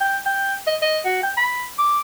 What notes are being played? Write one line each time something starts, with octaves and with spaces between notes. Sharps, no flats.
G5
G5
D#5
D#5
F#4
G5
B5
D6